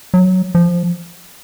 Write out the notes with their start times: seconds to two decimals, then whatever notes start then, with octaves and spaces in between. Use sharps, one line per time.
0.14 F#3
0.55 F3